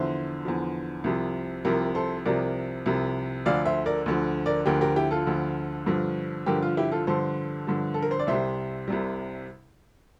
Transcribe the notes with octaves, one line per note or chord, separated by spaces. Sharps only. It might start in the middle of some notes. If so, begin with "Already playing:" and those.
Already playing: E2 D3 F3 C5 E5
E2 D3 F3
C2 C3 F3
C2 C3 F3 G4 A#4
A4 C5
C2 C3 F3 A#4 D5
C2 C3 F3
D2 D3 F3 D5 F5
C5 E5
A#4 D5
D2 D3 F3
A#4 D5
D2 D3 F3 G4 A#4
G4 A#4
E4 G4
F4 A4
D2 D3 F3
G2 D3 F3
G2 D3 F3 G4 A#4
F4
E4 G4
F4 A4
G2 D3 F3 A4 C5
G2 D3 F3
A4
A#4
C5
D5
C2 C3 G3 C5 E5
C2 C3 G3